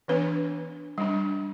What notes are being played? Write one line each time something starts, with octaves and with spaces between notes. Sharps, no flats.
E3 B3 D4 B4
G3 D4